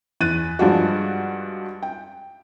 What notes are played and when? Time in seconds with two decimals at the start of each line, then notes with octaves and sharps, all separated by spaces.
0.21 E2 F#6 A6 D#7
0.59 G2 F3 G#3 D4 F4 F#4
1.83 G5